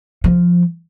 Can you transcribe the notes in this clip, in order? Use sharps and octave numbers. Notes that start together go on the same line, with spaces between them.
F3